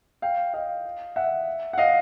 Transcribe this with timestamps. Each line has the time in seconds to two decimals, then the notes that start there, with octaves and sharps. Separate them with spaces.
0.22 F5 G5
0.54 D#5 F5
1.16 E5 F#5
1.73 F#5
1.78 D#5 F5